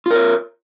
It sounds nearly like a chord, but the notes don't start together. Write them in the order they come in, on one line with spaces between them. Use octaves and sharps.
F4 A#4 C#5